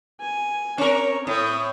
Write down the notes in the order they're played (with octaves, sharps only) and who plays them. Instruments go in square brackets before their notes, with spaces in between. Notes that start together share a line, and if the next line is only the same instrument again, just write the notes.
[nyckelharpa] G#5
[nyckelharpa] C4 C#5 [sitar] C#4 A#4
[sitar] A2 [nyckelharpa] D#6